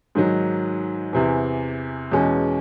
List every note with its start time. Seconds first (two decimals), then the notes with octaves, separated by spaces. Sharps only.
0.15 G#2 D#3 F#3
1.13 E2 C3 E3
2.12 E2 B2 G#3 C#4